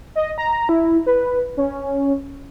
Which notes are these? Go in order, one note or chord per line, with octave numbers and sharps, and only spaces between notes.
D#5
A#5
E4
B4
C#4